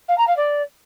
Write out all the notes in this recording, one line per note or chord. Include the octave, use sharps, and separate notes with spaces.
F5
A#5
F5
D5